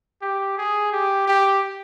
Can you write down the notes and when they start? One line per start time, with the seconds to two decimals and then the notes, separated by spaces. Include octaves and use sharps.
0.22 G4
0.57 G#4
0.92 G4
1.27 G4